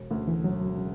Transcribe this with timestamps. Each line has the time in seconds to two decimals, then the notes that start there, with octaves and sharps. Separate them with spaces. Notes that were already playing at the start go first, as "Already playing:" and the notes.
Already playing: E1
0.11 D2 C#3 A3
0.28 E3
0.44 E1 F#3
0.77 C#3